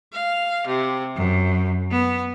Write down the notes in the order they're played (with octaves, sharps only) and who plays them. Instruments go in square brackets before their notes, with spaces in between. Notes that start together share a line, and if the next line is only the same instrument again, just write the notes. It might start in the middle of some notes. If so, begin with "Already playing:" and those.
[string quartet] F5
C3
F#2
B3